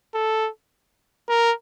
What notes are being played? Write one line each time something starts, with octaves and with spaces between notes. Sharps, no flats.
A4
A#4